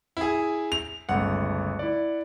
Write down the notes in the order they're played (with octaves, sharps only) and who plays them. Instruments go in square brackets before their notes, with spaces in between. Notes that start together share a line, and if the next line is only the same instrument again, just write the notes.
[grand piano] E4 G#4
F7
[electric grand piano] G1 C#2 A3 [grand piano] F#5
[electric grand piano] E4 D5